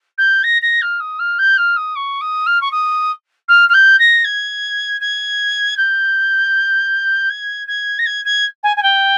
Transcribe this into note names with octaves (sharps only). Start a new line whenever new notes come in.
G6
A#6
A#6
F6
D#6
F6
G6
F6
D#6
C#6
D#6
F6
C#6
D#6
F6
F6
G6
A#6
G#6
G#6
G6
G#6
G#6
A#6
G#6
G#6
G#5
G#5
G5